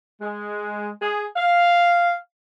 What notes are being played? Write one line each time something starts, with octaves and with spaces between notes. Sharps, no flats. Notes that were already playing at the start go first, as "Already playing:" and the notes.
G#3
G#4
F5